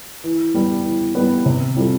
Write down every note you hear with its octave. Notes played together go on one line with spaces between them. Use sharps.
E3
G3 B3
E3
G3 B3
C3
G3 C4 F4 A4